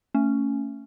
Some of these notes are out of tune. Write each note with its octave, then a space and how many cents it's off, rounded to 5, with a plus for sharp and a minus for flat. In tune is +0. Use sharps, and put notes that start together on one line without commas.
A3 +25 C#4 +0